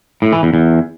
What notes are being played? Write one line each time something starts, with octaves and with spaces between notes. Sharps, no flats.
A2
E3
E2
E2